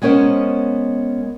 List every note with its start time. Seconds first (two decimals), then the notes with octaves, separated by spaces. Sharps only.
0.02 G#3 B3 C#4 A#4 C5